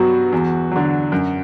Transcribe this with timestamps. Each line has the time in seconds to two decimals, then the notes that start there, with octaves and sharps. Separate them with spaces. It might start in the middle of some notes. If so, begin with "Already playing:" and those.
Already playing: G2 F#3 B3 F#4
0.32 E2
0.72 D3 F#3
1.12 F#2